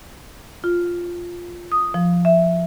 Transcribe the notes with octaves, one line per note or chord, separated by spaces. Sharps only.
F4
D#6
F3
E5